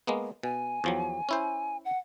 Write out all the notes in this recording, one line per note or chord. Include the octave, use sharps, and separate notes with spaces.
G#3 A#3 B3
B2 G#5
E2 F3 F#3
C#4 E4 C5
F#5